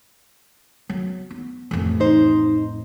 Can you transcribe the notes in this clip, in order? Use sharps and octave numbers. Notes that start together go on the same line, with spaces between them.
F#3 B3
B3
A1 F2
D#4 C5